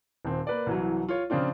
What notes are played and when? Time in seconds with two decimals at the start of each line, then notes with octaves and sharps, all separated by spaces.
0.25 D#1 C4
0.47 A#3 B4 D5
0.67 C2 E3 F#3
1.09 F4 C#5
1.30 C#3 F3 C4 D4 F4